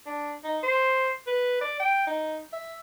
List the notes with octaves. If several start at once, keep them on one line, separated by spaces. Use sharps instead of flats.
D4
D#4
C5
B4
D5
G5
D#4
E5